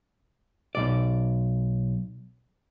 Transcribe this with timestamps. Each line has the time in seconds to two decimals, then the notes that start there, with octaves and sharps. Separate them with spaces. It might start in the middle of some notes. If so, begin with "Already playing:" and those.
0.75 B1 D5